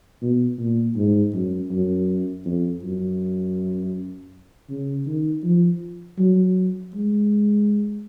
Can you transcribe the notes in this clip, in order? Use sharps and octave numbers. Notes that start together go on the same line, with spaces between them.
B2
A#2
G#2
F#2
F#2
F2
F#2
C#3
D#3
F3
F#3
G#3